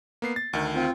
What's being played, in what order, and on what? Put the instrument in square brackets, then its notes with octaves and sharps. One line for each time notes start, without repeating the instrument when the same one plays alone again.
[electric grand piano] A#3 B3 C7
A6
D2 D#3
[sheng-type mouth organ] C4 F4